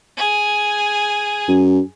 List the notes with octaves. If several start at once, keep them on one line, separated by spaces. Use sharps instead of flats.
G#4 G#5
F#2